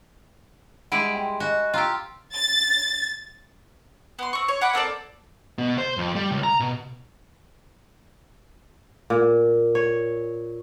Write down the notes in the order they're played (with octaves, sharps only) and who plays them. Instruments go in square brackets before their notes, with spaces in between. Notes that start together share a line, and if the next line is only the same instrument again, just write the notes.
[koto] G3 G#3 E4 [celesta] F#5 D7
[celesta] G5 C6
[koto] F#4 [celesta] D#5 G#5
[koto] F4 G4 [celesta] G5 A#5 E6
[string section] A6
[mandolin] B3 C6
C4 C#6
C#5
F#5 G#5 B5 D6
A#3 C4 A4 D5
[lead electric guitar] B2
C5
F2
G3
C#2
A#5
B2
[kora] A#2
C#5